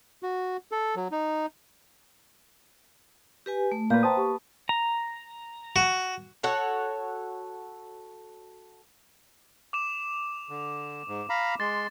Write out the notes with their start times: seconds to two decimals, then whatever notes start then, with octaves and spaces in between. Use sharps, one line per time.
0.23 F#4
0.72 A4
0.96 F#3
1.12 D#4
3.46 G4 B4 G#5
3.72 A3
3.90 A#2 B4 F5 A#5 G6
4.03 C5 G5 A5 C6 D#6
4.17 G4 C#6
4.69 A#5
5.76 F#4
6.43 F#4 A4 C#5 F#5
9.73 D6 E7
10.50 D3
11.08 G#2
11.30 F5 A#5 B5
11.60 G#3 C6 A6